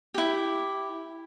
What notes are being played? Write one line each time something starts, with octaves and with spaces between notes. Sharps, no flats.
E4 G4